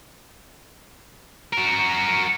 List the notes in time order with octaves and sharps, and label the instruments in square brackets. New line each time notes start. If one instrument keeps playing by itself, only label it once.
[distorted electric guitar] F#4 A#4